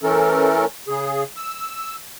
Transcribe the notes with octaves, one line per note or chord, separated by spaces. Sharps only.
E3 A3 C#4 A4 A#4
C#3 G#4
E6